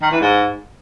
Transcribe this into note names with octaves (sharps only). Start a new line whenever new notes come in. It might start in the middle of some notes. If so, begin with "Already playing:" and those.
D#3
E3
G#2